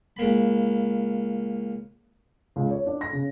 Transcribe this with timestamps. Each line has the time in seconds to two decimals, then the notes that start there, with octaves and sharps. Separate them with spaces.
0.17 C#2 A#3 B5
2.56 C#2
2.71 C#5
2.86 D4
3.01 A#6
3.13 C#3